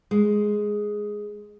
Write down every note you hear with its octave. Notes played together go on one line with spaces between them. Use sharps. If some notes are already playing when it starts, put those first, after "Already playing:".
G#3